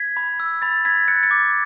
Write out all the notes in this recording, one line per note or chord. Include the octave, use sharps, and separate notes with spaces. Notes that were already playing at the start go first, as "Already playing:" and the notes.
Already playing: G#6 B6
B5
E6
B5 A6
B5 G#6 B6
F#6 A6 C#7
A6 C#7
D6